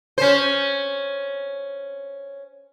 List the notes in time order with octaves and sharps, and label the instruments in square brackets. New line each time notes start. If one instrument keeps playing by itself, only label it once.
[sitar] C#4 C5